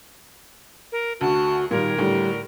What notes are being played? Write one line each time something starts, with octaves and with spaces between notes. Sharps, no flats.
A#4
D2 F#4 A5
A#2 D#3 G3 A#4
A2 D3 G3